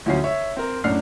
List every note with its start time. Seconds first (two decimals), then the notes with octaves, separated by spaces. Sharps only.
0.06 D2 F3 F#3 C#4 C7
0.24 C#5 E5
0.57 C4 A#4
0.84 F#2 A2 D4 F#5 F6 C7